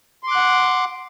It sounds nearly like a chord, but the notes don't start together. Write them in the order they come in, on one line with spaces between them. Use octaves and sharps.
C6 D6 F#6 F#5